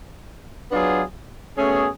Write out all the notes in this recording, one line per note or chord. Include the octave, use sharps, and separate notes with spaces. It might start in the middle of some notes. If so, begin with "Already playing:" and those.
F#3 B3 D4 F4 G#4
B2 A3 C#4 G#4